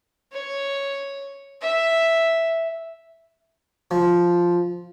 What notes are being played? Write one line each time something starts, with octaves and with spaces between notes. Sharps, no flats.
C#5
E5
F3